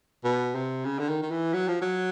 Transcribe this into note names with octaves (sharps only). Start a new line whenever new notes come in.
B2
C3
C#3
D3
D#3
D#3
E3
F#3
F3
F#3